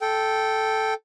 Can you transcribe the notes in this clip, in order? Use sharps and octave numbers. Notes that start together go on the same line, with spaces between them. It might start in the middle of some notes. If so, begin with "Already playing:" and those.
A4 G5